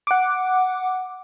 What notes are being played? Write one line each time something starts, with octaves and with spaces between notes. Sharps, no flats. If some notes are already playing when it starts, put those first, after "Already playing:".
F#5 D6